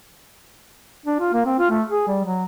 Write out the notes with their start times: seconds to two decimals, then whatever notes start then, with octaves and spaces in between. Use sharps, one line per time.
1.06 D4
1.20 F4
1.33 A#3
1.46 C4
1.59 F4
1.70 A3
1.90 G#4
2.08 G3
2.24 F#3